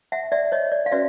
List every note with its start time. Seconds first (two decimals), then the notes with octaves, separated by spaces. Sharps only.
0.12 E5 F#5
0.32 D5 E5
0.52 C#5 D#5
0.72 D5
0.86 F5
0.91 C#4 F#4 B4 D5 E5